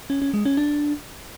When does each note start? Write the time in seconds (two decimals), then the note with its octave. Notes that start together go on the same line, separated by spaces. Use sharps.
0.10 C#4
0.22 C#4
0.34 G#3
0.45 C#4
0.57 D4